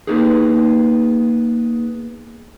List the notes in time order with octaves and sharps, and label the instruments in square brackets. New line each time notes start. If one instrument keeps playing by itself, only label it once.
[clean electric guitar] A#3 B3 D#4 G4 G#4